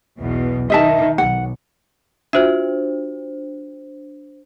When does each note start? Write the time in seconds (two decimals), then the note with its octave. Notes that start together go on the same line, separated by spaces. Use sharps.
0.18 B1 E2 B2
0.70 D#3 D#5 E5 A5
1.18 B1 F#5
2.33 D4 F4 F#4 C5 E5